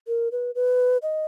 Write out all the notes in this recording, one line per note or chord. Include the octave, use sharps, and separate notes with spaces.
A#4
B4
B4
D#5